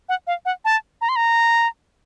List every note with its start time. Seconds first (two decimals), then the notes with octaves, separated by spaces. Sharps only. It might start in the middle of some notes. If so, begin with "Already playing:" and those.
0.09 F#5
0.27 F5
0.45 F#5
0.65 A5
1.01 A#5
1.09 C6
1.16 A#5